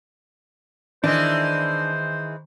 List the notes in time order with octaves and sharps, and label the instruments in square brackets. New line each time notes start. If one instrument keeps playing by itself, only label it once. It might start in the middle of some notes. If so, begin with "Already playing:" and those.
[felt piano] D#3 [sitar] E3 G#3 [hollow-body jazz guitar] D4 [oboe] C5